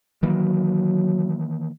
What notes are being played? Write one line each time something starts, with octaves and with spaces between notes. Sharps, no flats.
D#3 E3 F#3 A#3